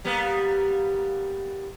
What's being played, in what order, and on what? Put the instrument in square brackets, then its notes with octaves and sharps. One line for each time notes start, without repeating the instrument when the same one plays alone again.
[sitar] G3 A#3 B3